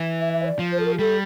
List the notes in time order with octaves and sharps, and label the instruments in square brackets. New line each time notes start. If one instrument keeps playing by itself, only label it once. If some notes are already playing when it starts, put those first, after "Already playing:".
Already playing: [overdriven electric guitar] E3
[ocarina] E5
E5
C5
D5
[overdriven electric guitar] F3
[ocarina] C5
A4
A#4
G4
[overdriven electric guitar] G3 [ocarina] A4